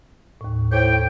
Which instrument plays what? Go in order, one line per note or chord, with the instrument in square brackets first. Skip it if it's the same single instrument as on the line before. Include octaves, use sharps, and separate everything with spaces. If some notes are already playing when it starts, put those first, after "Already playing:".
[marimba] D#2 A2
[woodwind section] A2 C#5 G5 [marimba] C5